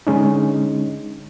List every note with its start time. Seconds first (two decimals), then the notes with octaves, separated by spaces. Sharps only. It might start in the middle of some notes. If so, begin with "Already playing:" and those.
0.07 D3 G#3 C#4 D#4